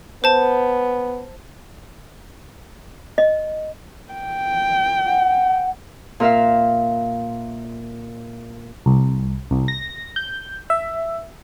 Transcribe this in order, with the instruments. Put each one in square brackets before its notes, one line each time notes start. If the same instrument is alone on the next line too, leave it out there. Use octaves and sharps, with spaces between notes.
[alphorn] B3 [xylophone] C5 A5
[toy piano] D#5
[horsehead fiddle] G5
[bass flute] F#5
[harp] A#2 A#4 E5 F5
[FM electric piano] C2
C2
A#6
G6
E5